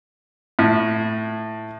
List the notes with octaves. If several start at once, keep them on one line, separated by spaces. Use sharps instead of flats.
A2